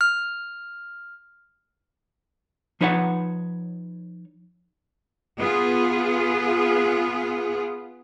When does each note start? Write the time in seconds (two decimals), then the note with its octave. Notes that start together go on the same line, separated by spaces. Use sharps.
0.01 F6
2.81 F3 D#4 B4 C#5 D#5 F#5
5.39 B3 F4 G#4